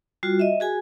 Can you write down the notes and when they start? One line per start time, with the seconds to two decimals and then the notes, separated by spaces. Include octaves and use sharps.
0.23 G3 F4 F#4
0.40 D#5 E5
0.60 F#4 G#4 G#5